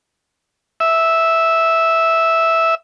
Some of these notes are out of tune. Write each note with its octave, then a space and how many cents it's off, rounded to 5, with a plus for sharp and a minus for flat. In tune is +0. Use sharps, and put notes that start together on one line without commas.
E5 -5